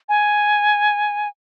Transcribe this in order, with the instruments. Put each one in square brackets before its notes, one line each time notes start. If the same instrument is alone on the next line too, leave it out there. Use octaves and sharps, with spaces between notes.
[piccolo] G#5